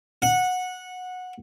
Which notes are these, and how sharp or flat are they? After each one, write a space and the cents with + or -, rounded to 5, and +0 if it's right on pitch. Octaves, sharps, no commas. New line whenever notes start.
F#5 -15